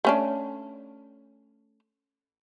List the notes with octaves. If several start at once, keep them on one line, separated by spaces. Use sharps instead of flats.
A3 C#4 D4